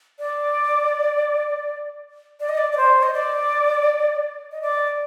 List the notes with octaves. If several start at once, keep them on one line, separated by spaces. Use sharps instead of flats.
D5
D5
D#5
D5
D5
C5
D#5
D5
D#5
D5